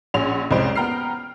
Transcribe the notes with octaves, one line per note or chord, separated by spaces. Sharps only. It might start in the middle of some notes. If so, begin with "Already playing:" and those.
A#1 C#4 G#4 F#5 C6 F7
C2 F2 G#3 C#4 C5 D7
B3 G5 A#5 F6 C7